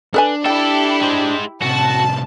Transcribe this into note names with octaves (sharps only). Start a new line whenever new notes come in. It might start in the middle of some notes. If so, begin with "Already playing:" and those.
D4 A4 B4 G#5
E4 G4 A4 G5
G#3 C5
A2 C3 F#4 A5